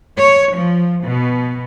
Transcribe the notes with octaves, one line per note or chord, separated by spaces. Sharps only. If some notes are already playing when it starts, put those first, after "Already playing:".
C#5
F3
B2